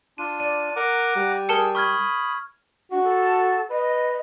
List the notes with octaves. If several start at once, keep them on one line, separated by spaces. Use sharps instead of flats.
D4 F4 D#7
D5 D#7
A#4 F#5 A#5 D6
G3
G#4 A#4 A5 E6 C#7
B5 C#6 D#6 F6 G#6
D4 F#4
A4
B4 D#5